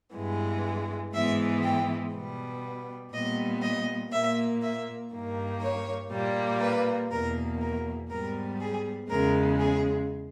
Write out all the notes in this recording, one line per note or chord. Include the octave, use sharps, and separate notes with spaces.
G2 E3 G#3 B3
G#2 E3 G#3 B3 E5
G5
B2 G3 B3
A#2 G3 B3 D#5
D#5
A#2 A#3 E5
E5
G2 D#3 A#3
C#5
A#2 G3 A#3
B4
E2 B2 A#3 A#4
A#4
G#2 G3 B3 A#4
G#4
E2 C#3 G#3 A#4
G#4